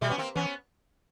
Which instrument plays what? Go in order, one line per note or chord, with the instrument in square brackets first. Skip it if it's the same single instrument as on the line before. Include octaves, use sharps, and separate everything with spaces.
[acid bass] B2 [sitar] G3 A3
[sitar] B3 C#4
A#3 C4
[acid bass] E3 [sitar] B3 C#4